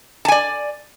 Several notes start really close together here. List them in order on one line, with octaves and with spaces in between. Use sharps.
A5 G#5 D5